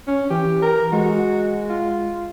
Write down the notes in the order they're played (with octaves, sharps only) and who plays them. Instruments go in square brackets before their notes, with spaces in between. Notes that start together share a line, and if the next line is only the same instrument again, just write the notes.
[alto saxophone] C#4
[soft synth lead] E3 [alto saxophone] G4
[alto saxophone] A#4
[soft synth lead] G#3 [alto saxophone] F#4
[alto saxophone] F4